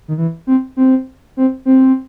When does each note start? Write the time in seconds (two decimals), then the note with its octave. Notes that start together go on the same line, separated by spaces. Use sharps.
0.08 D#3
0.18 E3
0.47 C4
0.77 C4
1.37 C4
1.65 C4